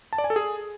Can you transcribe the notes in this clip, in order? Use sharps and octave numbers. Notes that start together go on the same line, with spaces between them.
A5
D5
G#5
A4
G#4